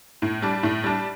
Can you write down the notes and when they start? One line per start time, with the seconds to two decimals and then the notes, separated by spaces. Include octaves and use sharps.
0.22 A2
0.42 G3 D4
0.63 A2
0.84 G3 D4